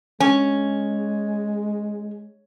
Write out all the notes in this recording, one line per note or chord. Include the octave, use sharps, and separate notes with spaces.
G#3 C#4